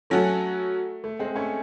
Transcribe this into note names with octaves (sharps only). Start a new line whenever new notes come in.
F#3 A3 C#4 F#4 A4
A3
G#3 C4
A3 C#4